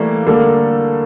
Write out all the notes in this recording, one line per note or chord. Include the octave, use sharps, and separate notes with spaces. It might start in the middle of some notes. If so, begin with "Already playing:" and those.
Already playing: E3 G3 A3 A#3
D3 G3 A#3 D4 A4